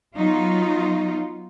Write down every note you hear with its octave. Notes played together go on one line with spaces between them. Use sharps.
F#3 B3 D#4 F4